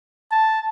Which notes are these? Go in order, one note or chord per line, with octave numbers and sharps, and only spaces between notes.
A5